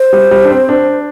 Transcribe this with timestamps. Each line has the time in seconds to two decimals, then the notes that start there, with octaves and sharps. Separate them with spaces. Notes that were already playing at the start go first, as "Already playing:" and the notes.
Already playing: C5
0.13 G3
0.31 G3
0.44 D4
0.51 C4
0.69 D4